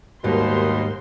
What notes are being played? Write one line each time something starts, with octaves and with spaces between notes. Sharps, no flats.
D#2 G#2 B2 G3 D#4 A#4 C5 C6